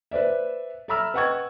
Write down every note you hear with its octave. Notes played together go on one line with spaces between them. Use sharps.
B4 C5 D5 E5
A4 E5 A#5 B5 E6 F6
B4 D#5 F#5 G5 C#6 G#6